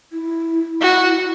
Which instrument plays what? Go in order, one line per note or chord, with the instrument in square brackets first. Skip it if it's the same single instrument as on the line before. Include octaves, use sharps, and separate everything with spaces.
[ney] E4
[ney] E4 [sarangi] F#4